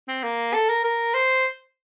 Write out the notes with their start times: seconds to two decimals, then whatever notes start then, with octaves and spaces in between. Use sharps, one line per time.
0.08 C4
0.23 A#3
0.54 A4
0.69 A#4
0.84 A#4
1.14 C5